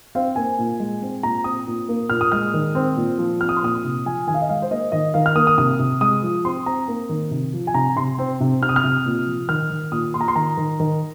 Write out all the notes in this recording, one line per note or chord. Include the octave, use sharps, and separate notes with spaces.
C4 F5
A#3 G#5
A#2
G#3
C4
A#2 A#5
C4 D#6
A#2
A#3
A#2 F6
D#6
G#3 F6
D#3
C4
A#2
F3
C4 F6
D#6
C6
A#2 D#6
C3
F3 G#5
D#3 G#5
F5
D#5
G#3 F5
C5
A#3 D#5
D#3 D#5
D#3 F5
F6
A#3 D#6
D#6
C3 D#6
C3
G#3 D#6
F3
C4 C6
C4 A#5
A#3
D#3
C3
F3
G#5
C3 A#5
C3 C6
C4
C3
C3 F6
D#6
F6
C3
A#2
F3
D#3 F6
D#3
A#2 D#6
A#2 C6
A#5
C6
D#3 A#5
D#3
D#3